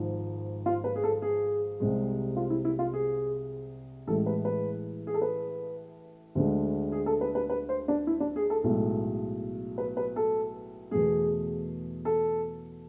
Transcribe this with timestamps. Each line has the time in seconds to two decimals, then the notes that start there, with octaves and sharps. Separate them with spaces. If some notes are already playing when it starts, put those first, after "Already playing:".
Already playing: G#1 G#2 F3
0.66 F4
0.84 B4
0.95 G#4
1.04 A4
1.22 G#4
1.80 C2 C3 G#3
2.36 F4
2.50 E4
2.65 E4
2.79 F4
2.93 G#4
4.07 A1 A2 E3 G#3 A4
4.26 B4
4.45 B4
5.07 G#4
5.14 A4
5.22 B4
6.35 D2 D3 G#3
6.92 G#4
7.06 A4
7.21 B4
7.35 B4
7.50 B4
7.69 C5
7.88 D4
8.07 E4
8.20 D4
8.36 G#4
8.50 A4
8.63 B1 A2 G#3 A4
9.78 B4
9.97 B4
10.16 A4
10.91 E2 B2 A3 G#4
12.05 A4